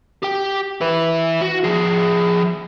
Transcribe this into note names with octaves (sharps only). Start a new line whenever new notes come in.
G4 G5
E4 B4
F#4
F3 G#4